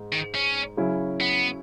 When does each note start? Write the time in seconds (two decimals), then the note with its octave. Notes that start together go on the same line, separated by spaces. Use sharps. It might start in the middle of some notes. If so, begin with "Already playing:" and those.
Already playing: G#2
0.12 D#3
0.35 C#4
0.77 C#3 F#3 C#4 E4
1.21 B3